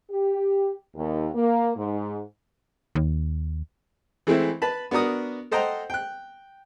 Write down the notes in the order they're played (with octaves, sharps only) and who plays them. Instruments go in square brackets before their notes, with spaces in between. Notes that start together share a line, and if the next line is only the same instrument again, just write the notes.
[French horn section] G4
D#2
A#3
G#2
[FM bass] D#2
[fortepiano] E3 G#3 A3 C4 E4
B4 A5 B5
B3 D4 F#4 A#4 D#6
A4 C5 D#5 F#5 G5 A#5
G5 F#6